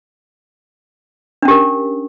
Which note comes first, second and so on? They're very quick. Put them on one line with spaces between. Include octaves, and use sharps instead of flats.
D4 C#4 G4 A#4